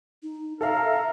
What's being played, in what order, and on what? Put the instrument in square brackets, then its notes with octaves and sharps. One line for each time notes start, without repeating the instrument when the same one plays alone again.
[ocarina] D#4
[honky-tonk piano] A4 F5 [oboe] A#4 [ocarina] E5